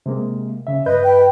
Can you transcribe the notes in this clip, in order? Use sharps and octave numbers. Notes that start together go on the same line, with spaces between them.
C3 G#3 A#3
C#3 E5
G2 B4 D#5 G6
G5